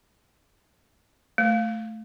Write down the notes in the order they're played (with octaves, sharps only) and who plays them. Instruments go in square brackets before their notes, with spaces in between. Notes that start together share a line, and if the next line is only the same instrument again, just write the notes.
[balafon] A3